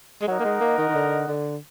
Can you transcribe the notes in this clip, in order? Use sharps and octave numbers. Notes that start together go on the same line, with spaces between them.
G#3
F#3 D#4 A#4 D#5 F#5
A#3
G#3
A#3
D#3
D#3
D3
D3